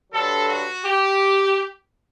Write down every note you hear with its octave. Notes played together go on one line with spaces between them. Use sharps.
G2 D3 F#3 A4
F#4
G4